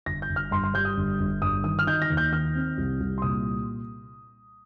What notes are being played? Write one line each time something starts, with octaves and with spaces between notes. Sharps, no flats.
G1 A#6
G6
G1
F6
G2 C6
C6
G3 G6
D#6
G1
G1
G2 D#6
D#3 D#6
F6
D#4 G6
A#6
D#2
G6
D#3 F6
C4
C2
C2
C6
A#2 D#6